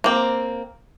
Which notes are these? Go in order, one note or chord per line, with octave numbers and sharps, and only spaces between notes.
A#3 C4